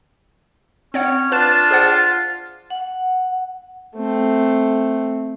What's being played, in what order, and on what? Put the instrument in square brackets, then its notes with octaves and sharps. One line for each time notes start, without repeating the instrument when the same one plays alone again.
[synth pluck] C4 C#5 F#5 [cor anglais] C#4
[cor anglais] D4 [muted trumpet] F4 [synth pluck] B4 F#6 E7 [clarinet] A5
[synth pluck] G#4 C5 F#5
[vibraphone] F#5
[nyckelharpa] A3 C4